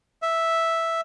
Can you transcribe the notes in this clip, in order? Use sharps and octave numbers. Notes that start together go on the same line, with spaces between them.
E5